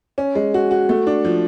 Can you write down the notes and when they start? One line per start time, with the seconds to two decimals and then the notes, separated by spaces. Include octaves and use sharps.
0.18 C#4
0.35 G#3
0.54 F#4
0.71 F#4
0.89 A3
1.07 D4
1.25 F3